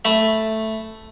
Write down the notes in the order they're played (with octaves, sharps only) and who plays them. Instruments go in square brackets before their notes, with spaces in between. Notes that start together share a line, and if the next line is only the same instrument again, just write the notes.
[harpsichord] A3 B5